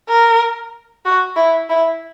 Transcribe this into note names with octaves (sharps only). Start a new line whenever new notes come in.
A#4
F#4
E4
E4